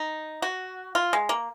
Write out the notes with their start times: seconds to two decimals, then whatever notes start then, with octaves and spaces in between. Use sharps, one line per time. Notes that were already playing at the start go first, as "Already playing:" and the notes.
Already playing: D#4
0.42 F#4
0.95 F4
1.13 G#3
1.29 A#3